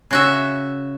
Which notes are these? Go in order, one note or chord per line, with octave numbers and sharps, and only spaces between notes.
C#3 F#4 E5